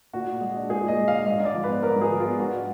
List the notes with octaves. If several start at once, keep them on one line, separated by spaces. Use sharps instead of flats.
A#2 F#4
A#2
G#3
D4
A#2 G#4
A#2 D#5
G#3
F5
D4
G#2 D#5
G#2
D5
F3
B4
B3
G#2 A#4
G#2
G#4
F3
F4
B3
G#2 F#4
D4